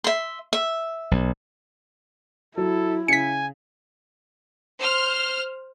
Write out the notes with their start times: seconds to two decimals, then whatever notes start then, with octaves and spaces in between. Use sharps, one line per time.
0.04 E5 C6
0.53 E5
1.11 B1
2.57 F#3 E4 A4
3.08 C#3 G#5 B6 C#7
4.77 C5 F6